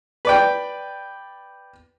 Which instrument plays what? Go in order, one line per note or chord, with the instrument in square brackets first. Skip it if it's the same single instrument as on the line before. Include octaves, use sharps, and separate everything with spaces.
[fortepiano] B4 D5 G5